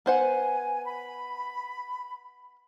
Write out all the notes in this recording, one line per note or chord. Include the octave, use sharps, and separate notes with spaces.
B3 C5 F#5 G#5
B5